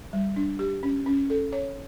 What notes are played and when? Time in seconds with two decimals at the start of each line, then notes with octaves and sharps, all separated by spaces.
0.13 G3
0.36 D4
0.59 G4
0.83 C#4
1.06 C#4
1.30 A4
1.53 C#5